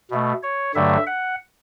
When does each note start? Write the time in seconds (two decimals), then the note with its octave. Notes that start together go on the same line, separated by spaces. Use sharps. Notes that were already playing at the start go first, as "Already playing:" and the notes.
0.11 B2 A3
0.43 C#5
0.75 G2 D3 F#3 A3 E5
1.07 F#5